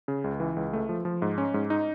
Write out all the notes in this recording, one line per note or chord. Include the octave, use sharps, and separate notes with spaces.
C#3
C#2
E3
C#2
A3
F3
F3
G#2
C#4
G#2
D#4